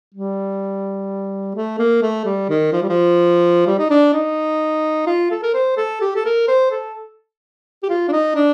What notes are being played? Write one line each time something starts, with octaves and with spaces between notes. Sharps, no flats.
G3
A3
A#3
A3
G3
D#3
F3
G3
F3
G3
D#4
D4
D#4
F4
A4
A#4
C5
A4
G4
A4
A#4
C5
A4
G4
F4
D4
D#4
D4